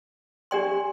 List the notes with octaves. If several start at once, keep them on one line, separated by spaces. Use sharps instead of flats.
D4 G4 D5 G5 C6